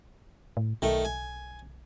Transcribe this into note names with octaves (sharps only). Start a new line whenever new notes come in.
A2
B1 D#3 A3
G#5